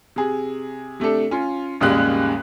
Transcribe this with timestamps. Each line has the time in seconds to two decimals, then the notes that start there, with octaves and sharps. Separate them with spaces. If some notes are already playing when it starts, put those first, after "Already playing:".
0.16 C3 G#4
1.00 C3 A3 D4 A4
1.31 C#4 F4
1.81 G#1 D#2 C#3 G3 G#3 F#6